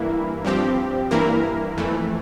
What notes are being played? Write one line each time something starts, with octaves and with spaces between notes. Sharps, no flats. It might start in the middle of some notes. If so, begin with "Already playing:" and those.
Already playing: G2 E3 A#3 E4
G2 F3 C4 G4
G2 E3 A#3 E4 A#4
F2 E3 A3